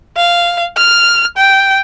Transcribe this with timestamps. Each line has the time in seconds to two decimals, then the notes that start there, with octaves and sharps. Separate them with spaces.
0.17 F5
0.77 F6
1.37 G5